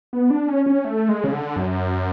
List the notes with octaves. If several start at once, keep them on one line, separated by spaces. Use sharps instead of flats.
B3
D4
C#4
C#4
A3
G#3
C#3
D3
F#2